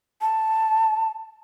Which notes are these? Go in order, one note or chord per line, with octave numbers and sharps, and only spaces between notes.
A5